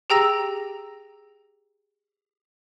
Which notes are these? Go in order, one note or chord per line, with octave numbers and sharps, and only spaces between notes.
G4 G#4 G5 A#5 E6 A#6